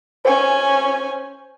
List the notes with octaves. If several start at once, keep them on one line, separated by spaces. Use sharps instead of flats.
C#4 C5 G#5